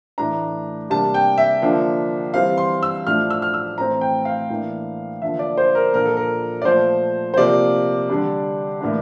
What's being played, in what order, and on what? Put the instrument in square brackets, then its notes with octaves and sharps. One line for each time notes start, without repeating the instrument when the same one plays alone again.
[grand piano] A2 E3 A3 D4 A#5
C3 G3 A#3 D4 A5
G5
E5
D3 F3 A#3 D4
E3 G3 C4 F5
C6
E6
A2 F3 A3 D4 F6
E6
F6
E6
A2 E3 A3 C4 A#5
G5
F5
A2 E3 A#3 D4
D3 F3 A#3 E5
D5
C5
A#4
A#2 F3 A#3 D4 A#4
A4
A#4
D5
A#2 F3 A3 C5
C5
C3 F3 A#3 D5
D3 G3 D4
A2 E3 A#3 D4